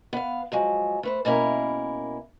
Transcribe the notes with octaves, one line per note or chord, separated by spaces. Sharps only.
B3 F5
F3 F#3 G#3
A3 B4 C5
B2 A#3 C#4 E4 A#4